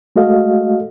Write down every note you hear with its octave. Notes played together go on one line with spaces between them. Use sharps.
G#3 A3 F#4 A4 D#5 F5